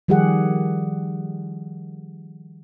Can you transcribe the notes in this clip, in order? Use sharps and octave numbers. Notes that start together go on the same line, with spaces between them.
D#3 F3 G3 G4 G#4 F#5